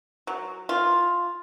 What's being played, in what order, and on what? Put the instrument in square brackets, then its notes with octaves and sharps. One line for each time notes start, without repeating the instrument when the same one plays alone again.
[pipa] F#3
F4